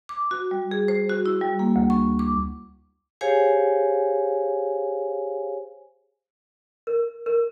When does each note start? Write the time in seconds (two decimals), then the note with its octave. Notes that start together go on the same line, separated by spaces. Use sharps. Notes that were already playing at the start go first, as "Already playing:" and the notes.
0.09 D6
0.31 F#4
0.51 G3
0.71 G#4
0.88 C5
1.10 F#4
1.26 E4
1.41 G3
1.59 A#3
1.76 D2
1.90 C#6
2.19 D6
3.21 G4 G#4 C5 C#5 F5 G#5
6.87 A#4
7.26 A#4